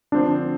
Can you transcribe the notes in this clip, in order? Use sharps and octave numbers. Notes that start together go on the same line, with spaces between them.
D3 F3 C4 D4